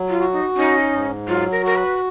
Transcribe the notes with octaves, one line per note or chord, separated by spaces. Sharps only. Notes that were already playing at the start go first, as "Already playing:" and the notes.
Already playing: F#3
F4
F#4
D#4
C#4 D#4
G#2
F#3 F4
A#4
F#4 A#4
B4